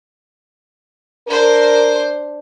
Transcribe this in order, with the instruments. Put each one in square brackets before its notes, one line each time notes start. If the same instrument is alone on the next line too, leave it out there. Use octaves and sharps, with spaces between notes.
[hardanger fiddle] D4 C5 [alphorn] A#4